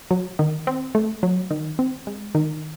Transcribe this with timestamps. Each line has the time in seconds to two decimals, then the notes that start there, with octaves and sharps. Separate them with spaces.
0.11 F#3
0.39 D#3
0.67 C4
0.95 A3
1.23 F#3
1.51 D#3
1.79 C4
2.07 G#3
2.35 D#3